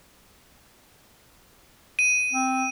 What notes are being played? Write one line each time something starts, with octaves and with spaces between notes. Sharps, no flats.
D#7
C4